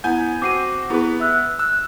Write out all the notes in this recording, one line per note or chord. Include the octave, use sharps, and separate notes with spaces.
B3 E4 F#5 G#5 G6
C4 F#4 D6 C7 D#7
B3 E4 G4 G#4 B4
E5 E6 F#6
E6 F#6